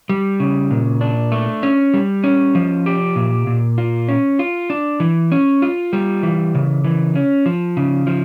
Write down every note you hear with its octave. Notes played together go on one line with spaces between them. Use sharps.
G3
C#3
A#2
D4
A3
C#4
G3
C#4
F3
G4
A#2
A#2
F4
C#4
F4
D4
E3
C#4
F4
G3
E3
C#3
E3
C#4
F3
C#3
F3